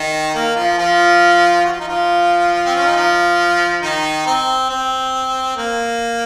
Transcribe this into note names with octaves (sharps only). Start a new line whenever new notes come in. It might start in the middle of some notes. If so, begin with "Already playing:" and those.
Already playing: D#3 D#4
A#3
F3 F4
F3 F4
F#4
F4
D#4
F3 F4
C4
C#4
D#4
F3 F4
D#3 D#4
C4
C4
A#3